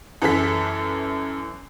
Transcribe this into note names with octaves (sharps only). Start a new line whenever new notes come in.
F#2 E3 A4 B6